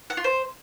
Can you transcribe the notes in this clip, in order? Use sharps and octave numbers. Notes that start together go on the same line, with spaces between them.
F#5
F4
C5